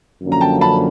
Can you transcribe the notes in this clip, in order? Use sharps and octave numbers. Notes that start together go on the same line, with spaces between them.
F#2 D3 F3 A#3 C#4
A#5
G5 A5
A5 B5